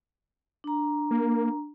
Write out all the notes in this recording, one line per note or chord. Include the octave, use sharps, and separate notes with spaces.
D4 A#5
A#3